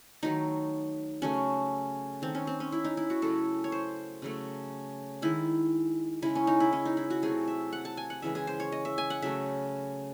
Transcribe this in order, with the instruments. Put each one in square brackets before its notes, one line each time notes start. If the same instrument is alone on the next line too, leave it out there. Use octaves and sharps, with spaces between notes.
[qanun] D#3 F#3 A3 D#4
C#3 F#3 A3 C#4
D#3 A3 C4
C#4
C4
C#4
E4
D#4
E4
F#4
C#3 F#3 A3 A4
C#5
C5
C#3 F#3 A3
D#3 G#3 E4
C#3 G#3 E4
C#4
D#4
E4
C#4
D#4
E4
F#4
C3 F#3 A3 G#4
E5
F#5
A5
G#5
F#5
C#3 E3 G#3 E5
G#4
C5
C#5
D#5
E5
G#5
F#5
C#3 F#3 A3 E5